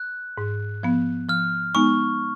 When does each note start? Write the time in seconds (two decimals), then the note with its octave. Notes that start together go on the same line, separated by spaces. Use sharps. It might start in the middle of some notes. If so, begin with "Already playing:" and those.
Already playing: F#6
0.38 G#2
0.83 F3 B3
1.28 F3 F6
1.75 G#3 B3 D#4 C#6